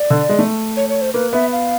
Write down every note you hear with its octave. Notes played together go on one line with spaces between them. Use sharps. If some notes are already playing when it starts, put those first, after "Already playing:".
Already playing: D5
D3
G#3
A3
C#5
C#5
C5
A#3 B4
B3 E5
F5